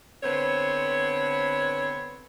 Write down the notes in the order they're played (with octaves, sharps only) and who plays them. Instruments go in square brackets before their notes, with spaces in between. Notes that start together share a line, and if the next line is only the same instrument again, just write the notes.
[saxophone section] D3 B3 C4 C5 C#5